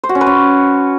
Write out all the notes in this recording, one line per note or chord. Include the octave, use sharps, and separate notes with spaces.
C5
F#4
C#4
B4
C#4